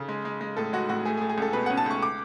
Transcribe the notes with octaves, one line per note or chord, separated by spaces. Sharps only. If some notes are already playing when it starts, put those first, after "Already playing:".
Already playing: C#3 A4
G#3
G#3
G#3
A2 A4
G#3 F#4
A2 F#4
A3 G#4
G#4
A3
G#4
C#2 A4
B2 B4
C#4 F#5
A5
C#2 C#6
D6